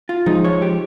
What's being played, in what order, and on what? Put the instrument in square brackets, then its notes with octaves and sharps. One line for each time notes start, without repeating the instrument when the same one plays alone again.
[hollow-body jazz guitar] F4
[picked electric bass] F3 G#3 [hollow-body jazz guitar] D#4
[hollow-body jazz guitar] C#5
G4